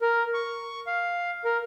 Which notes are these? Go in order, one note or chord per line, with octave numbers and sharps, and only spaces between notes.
A#4
C#6
F5
A#4